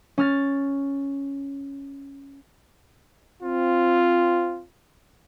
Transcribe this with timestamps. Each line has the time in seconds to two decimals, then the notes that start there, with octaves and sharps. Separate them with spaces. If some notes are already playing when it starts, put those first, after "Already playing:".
0.18 C#4 F6 A6
3.42 C4 F4